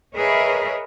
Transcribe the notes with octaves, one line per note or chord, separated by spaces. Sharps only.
G#4 A#4 B4 C#5 D#5 E5